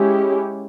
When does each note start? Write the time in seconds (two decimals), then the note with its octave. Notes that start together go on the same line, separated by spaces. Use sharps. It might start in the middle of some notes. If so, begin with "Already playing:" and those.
Already playing: G#3 C#4 E4 G4